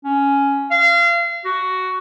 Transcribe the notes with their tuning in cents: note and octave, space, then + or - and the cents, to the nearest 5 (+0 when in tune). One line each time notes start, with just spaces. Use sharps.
C#4 +5
F5 -30
F#4 +10